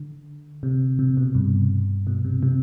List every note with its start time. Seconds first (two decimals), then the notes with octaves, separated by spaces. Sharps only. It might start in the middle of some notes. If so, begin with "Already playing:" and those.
Already playing: D3
0.63 C3
0.99 C3
1.17 B2
1.35 G2
2.07 B2
2.25 C3
2.43 C3